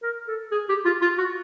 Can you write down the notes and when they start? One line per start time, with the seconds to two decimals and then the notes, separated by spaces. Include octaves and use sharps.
0.03 A#4
0.28 A4
0.52 G#4
0.69 G4
0.85 F4
1.02 F4
1.18 F#4